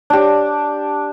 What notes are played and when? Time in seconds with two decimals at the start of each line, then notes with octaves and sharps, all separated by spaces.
0.10 D4 G4